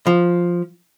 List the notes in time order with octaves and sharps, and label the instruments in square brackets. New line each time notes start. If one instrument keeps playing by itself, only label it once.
[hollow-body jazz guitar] F3